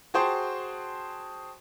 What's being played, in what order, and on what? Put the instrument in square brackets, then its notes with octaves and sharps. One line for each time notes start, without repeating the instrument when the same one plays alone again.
[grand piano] F#4 G#4 C5 G5 A5 C6